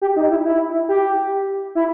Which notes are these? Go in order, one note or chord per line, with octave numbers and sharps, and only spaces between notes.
G4
D#4
E4
E4
G4
E4